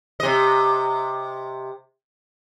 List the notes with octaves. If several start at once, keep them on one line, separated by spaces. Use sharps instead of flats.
C3 D#5